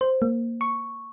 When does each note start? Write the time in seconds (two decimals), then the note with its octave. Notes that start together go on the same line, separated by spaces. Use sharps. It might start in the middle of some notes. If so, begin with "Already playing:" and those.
0.01 C5
0.22 A#3
0.61 C#6